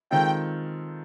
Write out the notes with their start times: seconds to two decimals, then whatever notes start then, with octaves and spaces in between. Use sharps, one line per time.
0.11 D#3 G#3 C4 F4 A4 G5